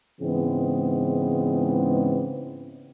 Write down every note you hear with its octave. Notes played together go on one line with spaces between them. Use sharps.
G#2 C#3 E3 G#3 B3 C4